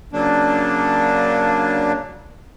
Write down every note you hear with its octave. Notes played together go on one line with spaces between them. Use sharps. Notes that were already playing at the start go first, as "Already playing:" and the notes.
C#3 F#3 A#3 D4